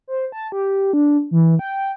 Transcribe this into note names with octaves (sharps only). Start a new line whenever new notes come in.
C5
A5
G4
D4
E3
G5